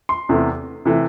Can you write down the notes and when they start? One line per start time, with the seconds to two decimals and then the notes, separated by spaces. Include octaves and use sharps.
0.09 C6
0.29 E2 C3 E3 A3
0.85 C3 E3 A3